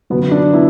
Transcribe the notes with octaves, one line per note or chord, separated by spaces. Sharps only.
F#2 D3 F#3 B3
D4
B3 E4